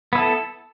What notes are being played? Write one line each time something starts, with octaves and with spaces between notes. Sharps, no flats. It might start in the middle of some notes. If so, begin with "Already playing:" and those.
B3 E4 A4